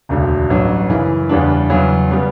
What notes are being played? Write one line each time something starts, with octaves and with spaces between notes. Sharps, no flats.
E1 D2 C#3
A1 G2 F#3
F#2 C#3 E3
E2 C#3 G3 B3 D4
E2 C#3 F#3
C#3 G3 B3